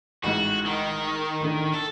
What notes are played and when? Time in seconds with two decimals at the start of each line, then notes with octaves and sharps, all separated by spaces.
0.24 A1 G#2 F#4
0.66 D#3
1.41 A1 D3
1.74 A4